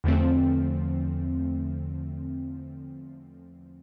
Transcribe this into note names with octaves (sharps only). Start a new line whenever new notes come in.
E2 D3 F3 A3 C4